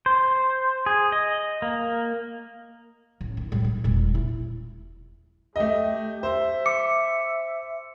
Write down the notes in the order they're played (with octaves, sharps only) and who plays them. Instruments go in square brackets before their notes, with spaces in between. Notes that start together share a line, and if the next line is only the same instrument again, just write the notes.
[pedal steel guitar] C5
G#4
D#5
A#3
[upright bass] A1
D#3
A2 G3
G2
E1 A#2
E4
[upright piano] A3 D#5 [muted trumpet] G4
[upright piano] C5 [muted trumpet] E5
[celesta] D6 [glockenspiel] C#7